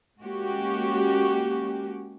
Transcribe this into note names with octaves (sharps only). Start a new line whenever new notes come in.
G#3 A#3 C#4 F#4 G4